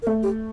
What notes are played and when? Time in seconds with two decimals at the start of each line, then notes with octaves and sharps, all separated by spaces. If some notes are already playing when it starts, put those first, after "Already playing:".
0.02 A#4
0.07 A3 A4
0.23 G4